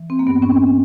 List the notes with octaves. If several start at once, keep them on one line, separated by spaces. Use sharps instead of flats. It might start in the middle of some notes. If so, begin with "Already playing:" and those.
Already playing: E3
C4
A#3
G2 B3
C#4
C4